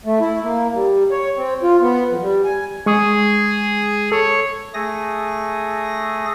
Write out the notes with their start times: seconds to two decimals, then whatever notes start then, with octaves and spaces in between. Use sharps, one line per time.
0.05 A3
0.20 E4
0.43 A#3
0.74 G3
1.11 C#5
1.37 C4
1.63 F4
1.81 B3
2.08 F2
2.22 G3
2.45 G#5
2.86 G#3 G#4 C#6 D#6
4.12 A4 C#5
4.74 A3 G#4 D#6 A#6